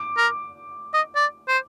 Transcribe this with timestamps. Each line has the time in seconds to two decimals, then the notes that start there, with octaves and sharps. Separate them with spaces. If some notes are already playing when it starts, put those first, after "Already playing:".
Already playing: D6
0.18 A#4
0.94 D#5
1.16 D5
1.48 C5